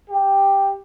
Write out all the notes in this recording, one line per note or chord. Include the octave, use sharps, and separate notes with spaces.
G4